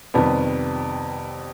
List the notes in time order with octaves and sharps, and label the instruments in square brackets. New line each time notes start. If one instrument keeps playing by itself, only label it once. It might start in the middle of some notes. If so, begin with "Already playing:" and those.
[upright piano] F2 C3 D#3 G3 B3